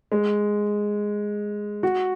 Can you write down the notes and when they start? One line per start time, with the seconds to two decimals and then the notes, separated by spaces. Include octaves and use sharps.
0.12 G#3
1.83 F#4